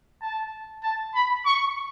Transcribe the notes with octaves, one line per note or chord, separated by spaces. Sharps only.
A5
A5
B5
C#6